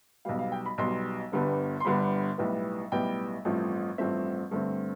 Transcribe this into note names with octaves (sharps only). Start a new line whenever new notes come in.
B1 B2 G3 F5
F5
G5
B5
B1 B2 G3 C6
G1 G2 D3 G3 B3
C6
G1 G2 D3 G3 B3 B5
B1 A2 G3 B3
B1 A2 G3 B3 G5
A1 G2 F3 A3 C4
A1 G2 F3 A3 C4 E5
G2 D3 A3 C4